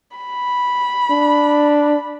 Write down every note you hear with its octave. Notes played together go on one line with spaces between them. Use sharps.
B5
D4